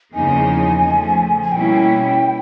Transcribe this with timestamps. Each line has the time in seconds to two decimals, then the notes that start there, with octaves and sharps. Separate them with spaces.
0.14 E2 C#3 F3 A#3 D#4 G#5
0.84 C#3 F3 A3
1.42 G#5
1.52 B2 G3 A#3 C#4 E4 G5